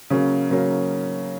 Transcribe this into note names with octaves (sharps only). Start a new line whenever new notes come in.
C#3 F#3 A#3 C#4
C#3 F#3 A#3 C#4